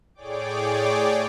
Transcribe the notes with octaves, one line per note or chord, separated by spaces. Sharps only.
A2 G#4 C#5 D5 G5 D6